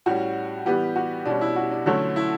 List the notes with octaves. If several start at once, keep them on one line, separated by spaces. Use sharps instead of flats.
A2 G3 C#4 F#4
E3 G3 B3 G4
F#4
B2 G3 C#4 D4
E4
F#4
D4
D3 F#3 A3 C#4 E4
E4